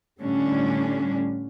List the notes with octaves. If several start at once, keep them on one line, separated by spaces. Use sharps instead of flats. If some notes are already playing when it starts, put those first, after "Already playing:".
A2 D3 G3 C#4 D4